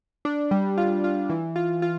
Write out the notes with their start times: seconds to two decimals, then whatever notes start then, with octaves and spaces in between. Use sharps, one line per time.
0.25 D4
0.51 G3
0.78 F4
1.04 F4
1.30 E3
1.56 F4
1.82 F4